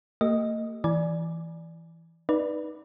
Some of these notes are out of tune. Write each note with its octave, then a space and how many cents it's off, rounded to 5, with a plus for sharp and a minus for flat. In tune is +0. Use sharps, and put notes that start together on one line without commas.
A#3 -45 G4 +0 D#5 +0
E3 +0 D5 +0 G#5 +10
D#4 +0 B4 -20 D5 +0